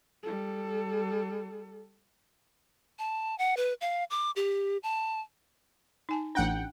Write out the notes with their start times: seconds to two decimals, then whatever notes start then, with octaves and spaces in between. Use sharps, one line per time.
0.23 G3 A4
2.98 A5
3.38 F#5
3.57 B4
3.81 F5
4.10 D6
4.36 G4
4.83 A5
6.09 D#4 G#5 A5
6.35 A1 D4 F#5 G5